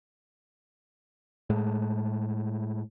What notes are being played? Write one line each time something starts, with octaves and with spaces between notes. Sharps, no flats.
A2 G#3 A3